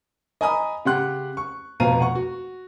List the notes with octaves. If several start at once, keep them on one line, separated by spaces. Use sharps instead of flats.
D#5 G#5 A#5 B5 D#6
C#3 G4 F#5 C6 F#6
C#6
F1 B2 F3 F5 A#5 D#7
F#5 C#6
F#4